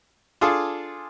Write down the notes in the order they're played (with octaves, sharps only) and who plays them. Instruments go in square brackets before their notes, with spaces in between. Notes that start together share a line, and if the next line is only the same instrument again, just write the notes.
[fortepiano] D4 F4 G#4 A4